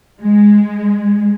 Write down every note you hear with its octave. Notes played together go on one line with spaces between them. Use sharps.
G#3